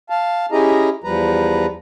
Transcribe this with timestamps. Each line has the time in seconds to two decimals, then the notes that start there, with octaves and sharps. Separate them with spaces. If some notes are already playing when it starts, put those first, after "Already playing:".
0.10 F5 A5
0.52 C#4 E4 G4 G#4 D#5 A#5
1.04 E2 F3 G3 B4 A#5